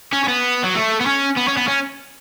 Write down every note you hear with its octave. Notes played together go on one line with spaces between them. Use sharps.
C#4
C#4
B3
F#3
A3
B3
C#4
B3
C#4
B3
C#4